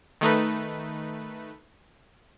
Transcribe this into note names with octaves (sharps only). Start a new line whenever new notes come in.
D#3 A3 D#4 B4